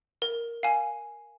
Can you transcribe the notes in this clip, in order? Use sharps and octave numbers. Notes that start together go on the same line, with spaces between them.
A#4
F5 G#5